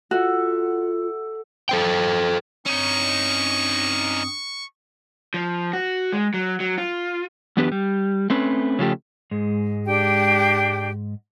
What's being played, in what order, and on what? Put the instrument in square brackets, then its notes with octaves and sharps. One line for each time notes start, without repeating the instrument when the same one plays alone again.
[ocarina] F4 [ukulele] F#4 [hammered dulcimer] A4 E5 F#5
[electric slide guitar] A4 C5 G5
[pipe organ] G2 C4 D#6 [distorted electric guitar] C#4 D#4 [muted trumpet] C#6
[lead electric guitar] F3
F#4
G#3
F#3
F#3
F4
[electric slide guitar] F#2 E3 B3 D4 G4 B4
G3
A3 C4 C#4 B4
C#3 F3 A3 G4
G#2 G#3
[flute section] D4 G4 G5